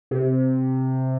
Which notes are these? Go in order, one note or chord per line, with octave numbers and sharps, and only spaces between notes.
C3